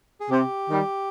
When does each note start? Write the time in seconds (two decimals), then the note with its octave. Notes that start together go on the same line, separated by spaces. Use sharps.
0.20 G#4
0.29 C3 G4
0.67 D#3 G3